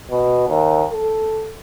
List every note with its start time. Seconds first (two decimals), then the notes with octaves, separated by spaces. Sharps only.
0.11 B2
0.48 D#2
0.92 A4